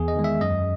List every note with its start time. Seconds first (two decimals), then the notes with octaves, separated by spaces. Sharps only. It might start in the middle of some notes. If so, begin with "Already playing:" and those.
Already playing: E2 G#4
0.08 D#5
0.16 D#3 G#3
0.24 E5
0.41 F#2 D#5